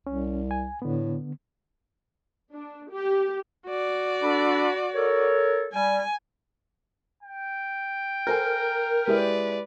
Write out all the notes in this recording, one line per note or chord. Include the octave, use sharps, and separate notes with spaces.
C2 C#4
G#5
A2 D3 B3
D4
G4
F#4 D5
D4 A4 B5
A4 A#4 C#5
G3 G#5
G5
A4 A#4 C5 G#5
G#3 E4 G4 B4 D5